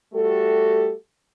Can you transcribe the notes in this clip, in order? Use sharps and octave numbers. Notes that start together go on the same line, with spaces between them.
G3 A3 F#4 G4 A4